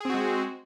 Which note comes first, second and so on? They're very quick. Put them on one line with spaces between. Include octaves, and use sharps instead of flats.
G#4 C4 F#4 G#3